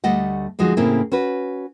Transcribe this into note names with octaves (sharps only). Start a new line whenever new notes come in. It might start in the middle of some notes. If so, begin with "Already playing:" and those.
D2 G3 A3 D#5 F#5
D2 F3 G#3 D#4 F#4
A2 C#3 A#3 C4 C#4 E4
C#4 F#4 B4